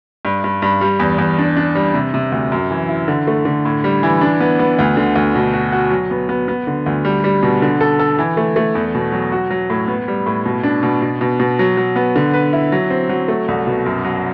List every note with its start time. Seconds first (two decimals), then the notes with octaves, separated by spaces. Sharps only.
0.25 G2
0.44 G2
0.62 G2
0.81 G3
0.99 E2
1.18 E2
1.38 D4
1.57 D4
1.75 G3
1.94 C3
2.14 C3
2.32 D2
2.52 F#2
2.71 E3
2.88 E4
3.08 D3
3.27 A3
3.45 D3
3.65 A2
3.84 G3
4.03 E3
4.21 D4
4.40 B3
4.59 B3
4.79 D2
4.97 D3
5.15 D2
5.35 B2
5.54 F#4
5.72 F#4
5.91 F#3
6.11 B3
6.29 B3
6.48 B3
6.67 D3
6.86 D2
7.05 G3
7.24 G3
7.43 B2
7.62 D3
7.81 A4
8.00 A4
8.19 E3
8.37 A3
8.56 A3
8.75 E2
8.95 B2
9.12 F#3
9.32 F#4
9.50 F#3
9.70 A2
9.88 B3
10.08 G3
10.26 A2
10.46 B2
10.63 D4
10.83 B2
11.02 B2
11.21 B2
11.40 B2
11.59 F#3
11.77 F#3
11.96 B3
12.16 D3
12.34 B4
12.53 E4
12.72 F#3
12.90 C4
13.09 F#3
13.28 A3
13.48 C2
13.67 B2
13.86 F#2
14.05 F#3